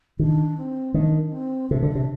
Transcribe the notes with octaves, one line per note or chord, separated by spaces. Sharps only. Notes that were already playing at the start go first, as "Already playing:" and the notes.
D#3 D4
C4
D#3 D4
C4
C3 D4
D3
C3